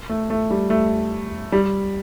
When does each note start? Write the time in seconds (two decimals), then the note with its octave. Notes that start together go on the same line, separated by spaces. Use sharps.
0.09 A3
0.30 A3
0.50 G3
0.70 A3
1.52 G3